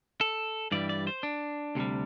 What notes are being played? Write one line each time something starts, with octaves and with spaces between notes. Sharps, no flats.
A4
G2 E3 G3 D5
D5
C5
D4
D2 C3 G3